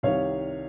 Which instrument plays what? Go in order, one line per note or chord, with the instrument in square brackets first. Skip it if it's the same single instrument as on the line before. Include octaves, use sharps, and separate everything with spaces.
[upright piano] C2 C3 D#3 C#5 F5